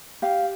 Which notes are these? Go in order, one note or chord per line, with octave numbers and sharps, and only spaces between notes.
G4 F5